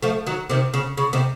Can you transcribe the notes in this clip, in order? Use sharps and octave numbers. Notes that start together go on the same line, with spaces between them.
F3 A3
D#3 F#3
C3 D#3
C#3
C#3
C3 D#3